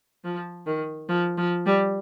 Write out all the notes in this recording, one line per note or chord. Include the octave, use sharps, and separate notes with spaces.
F3
D#3
F3
F3
G3